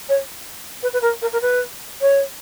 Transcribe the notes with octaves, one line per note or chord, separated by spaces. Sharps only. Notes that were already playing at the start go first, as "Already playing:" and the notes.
C#5
B4
B4
A#4
A#4
A#4
B4
C#5